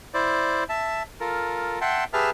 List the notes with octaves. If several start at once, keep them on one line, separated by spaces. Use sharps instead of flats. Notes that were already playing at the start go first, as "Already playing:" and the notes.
E4 C5 D5
E5 A5
F4 A4 A#4
E5 F#5 G5 A5 C6
G4 G#4 B4 E5 A5 F6